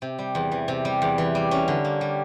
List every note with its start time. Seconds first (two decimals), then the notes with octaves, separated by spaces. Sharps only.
0.02 C3
0.19 G3
0.35 E2
0.52 E3
0.68 C3
0.85 G3
1.02 E2
1.18 E3
1.35 G3
1.51 C#4
1.68 D3
1.84 A#3
2.01 G3